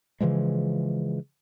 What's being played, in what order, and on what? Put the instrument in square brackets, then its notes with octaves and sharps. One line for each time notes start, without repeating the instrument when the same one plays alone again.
[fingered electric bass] C#3 E3 F3 G#3